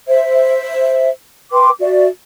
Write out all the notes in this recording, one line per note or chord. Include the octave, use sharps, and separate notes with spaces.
C5 E5
B4 G5 C6 D6
F#4 D5 E5